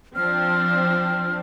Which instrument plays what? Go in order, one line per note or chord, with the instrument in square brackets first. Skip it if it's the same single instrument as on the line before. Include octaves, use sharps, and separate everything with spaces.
[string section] F3 C4 D4 [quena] F6